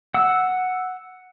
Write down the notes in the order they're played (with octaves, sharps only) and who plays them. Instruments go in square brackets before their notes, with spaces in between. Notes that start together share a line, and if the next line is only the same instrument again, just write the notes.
[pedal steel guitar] F#5 E6